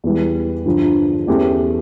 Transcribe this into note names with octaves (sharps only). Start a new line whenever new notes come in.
E2 E3 G3
G2 D3 F3
E2 E3 A3 C#4 G4